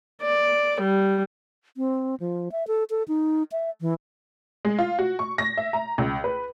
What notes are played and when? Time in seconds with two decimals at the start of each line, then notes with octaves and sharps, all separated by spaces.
0.23 D5
0.82 G3
1.77 C4
2.20 F3
2.52 E5
2.67 A4
2.90 A4
3.08 D#4
3.52 E5
3.81 E3
4.65 G#3
4.79 F4
4.99 F#4
5.19 C#6
5.38 A#6
5.57 E5
5.73 A#5
5.98 C#2
6.24 B4